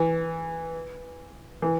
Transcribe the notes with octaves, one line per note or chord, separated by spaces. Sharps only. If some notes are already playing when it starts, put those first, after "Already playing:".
Already playing: E3
E3